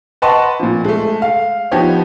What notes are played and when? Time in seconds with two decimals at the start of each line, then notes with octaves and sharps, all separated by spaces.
0.22 B4 D#5 F#5 A5 C6 C#6
0.59 A#2 F3
0.85 G#3 A3
1.22 F5
1.71 F3 B3 D#4 G4 C#5